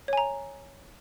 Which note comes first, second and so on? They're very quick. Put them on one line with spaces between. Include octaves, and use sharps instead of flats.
C#5 G#5 A#5